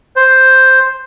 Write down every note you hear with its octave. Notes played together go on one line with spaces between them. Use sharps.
C5